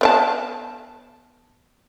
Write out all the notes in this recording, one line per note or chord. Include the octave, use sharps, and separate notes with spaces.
B3 C#5 A5